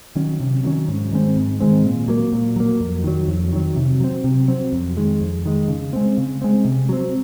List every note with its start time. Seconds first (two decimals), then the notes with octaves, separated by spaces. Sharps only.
0.15 D#3 F#3 C#4
0.40 C3
0.64 D#3 F#3 C#4
0.88 G#2
1.12 D#3 G#3 C4
1.37 G#2
1.60 D#3 G#3 C4
1.84 A#2
2.08 F#3 A#3
2.33 A#2
2.56 F#3 A#3
2.80 F2
3.04 D#3 F#3
3.28 F2
3.52 D#3 F#3
3.76 C3
4.00 F#3 C4
4.24 C3
4.48 F#3 C4
4.72 F2
4.97 D#3 G#3
5.21 F2
5.45 D#3 G#3
5.68 C#3
5.93 G#3 C4
6.18 C#3
6.42 G#3 C4
6.65 C3
6.89 F#3 C4